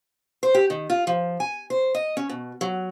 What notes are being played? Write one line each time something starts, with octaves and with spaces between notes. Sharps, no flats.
C5
G4
D#3
F4
F3
G#5
C5
D#5
C#4
B2
F#3